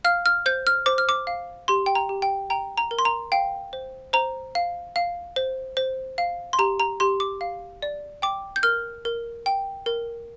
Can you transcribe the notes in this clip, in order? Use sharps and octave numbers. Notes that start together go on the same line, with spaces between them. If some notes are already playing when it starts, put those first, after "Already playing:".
F5 F6
F6
C5 G6
F6
C5 D6
F6
D6
F5
G4 C6
G5
A#5
G4
G5
G5 A#5
A#5
A#4
C6
A#5
F5 G5
C5
C5 A#5
F5
F5
C5
C5
F5
C6
G4 A#5
A#5
G4 C6
D6
F5
D5
G5 D6
G6
A#4 F6
A#4
G5
A#4